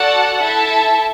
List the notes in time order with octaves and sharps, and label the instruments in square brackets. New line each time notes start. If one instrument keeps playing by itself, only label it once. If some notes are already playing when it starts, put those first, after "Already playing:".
Already playing: [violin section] F#4 A4 D5 F#5 A5
E4 A4 E5 A5